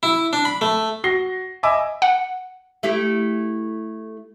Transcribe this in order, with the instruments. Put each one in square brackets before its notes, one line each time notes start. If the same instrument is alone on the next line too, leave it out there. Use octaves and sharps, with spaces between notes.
[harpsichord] E4
D4
B5
A3
[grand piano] F#4 A#6 C7 G7
D#5 E5 G#5 B5 D6 E6
[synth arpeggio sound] F#5
[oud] A3 E4 G4